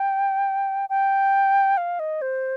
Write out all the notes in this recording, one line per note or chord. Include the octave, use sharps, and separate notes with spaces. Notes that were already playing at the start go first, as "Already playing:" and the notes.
Already playing: G5
G5
F5
D#5
C5